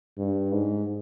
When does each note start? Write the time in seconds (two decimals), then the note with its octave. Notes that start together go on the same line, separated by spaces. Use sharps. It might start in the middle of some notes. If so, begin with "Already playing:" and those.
0.18 G2
0.52 G#2